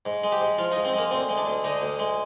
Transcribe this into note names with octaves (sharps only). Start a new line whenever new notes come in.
G#2
G#3
G4
G#2
F3 F4
D#4
G#2
C4
G#3 A#3
D2 C4
G#3
D4
D2
D3 D#4
D2
G#3